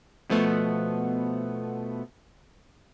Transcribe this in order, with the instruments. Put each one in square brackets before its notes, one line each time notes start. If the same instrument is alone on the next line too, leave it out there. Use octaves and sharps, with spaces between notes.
[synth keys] B2 F3 A3 B3